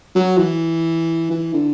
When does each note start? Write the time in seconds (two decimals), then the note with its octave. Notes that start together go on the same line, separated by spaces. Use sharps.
0.15 F#3
0.38 E3
1.30 E3
1.54 D3